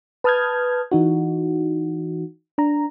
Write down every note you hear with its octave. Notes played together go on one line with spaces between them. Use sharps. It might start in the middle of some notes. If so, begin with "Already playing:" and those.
B4 A5 D#6 F6 G6 G#6
E3 D#4 F#4
D4 A#5